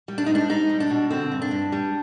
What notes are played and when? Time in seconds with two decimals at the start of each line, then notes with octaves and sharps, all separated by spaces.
0.08 G3
0.18 D4
0.26 G#2 D#4
0.35 D4
0.49 G3 D#4
0.69 G3
0.80 D4
0.90 B2
1.10 D3 C4
1.32 G2
1.42 D4
1.51 G2
1.72 G3